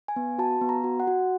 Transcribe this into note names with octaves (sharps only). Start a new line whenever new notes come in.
G#5
B3
F#4 A5
B3
A#5
F#4
F#5
F#4